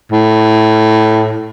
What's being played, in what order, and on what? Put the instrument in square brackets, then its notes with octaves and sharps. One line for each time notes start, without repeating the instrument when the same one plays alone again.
[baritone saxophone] A2